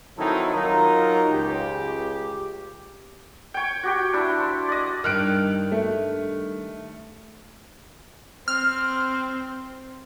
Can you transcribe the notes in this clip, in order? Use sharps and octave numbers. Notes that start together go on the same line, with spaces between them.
D#3 F#3 C4 D#4 E4 A4
F#3 D#4 F4 A#4
C#2 G4
C#5 G5
F#4 G4 G5
D4 E4
C5
D5 D#5
G2 D#3 F6 F#6 D7
A3
C4 F6